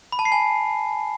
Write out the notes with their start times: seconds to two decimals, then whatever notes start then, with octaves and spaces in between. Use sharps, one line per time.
0.12 B5
0.19 A5
0.25 C7
0.32 G#5